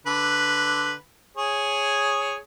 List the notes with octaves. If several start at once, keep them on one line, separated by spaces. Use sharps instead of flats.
D3 B4
G#4 C#5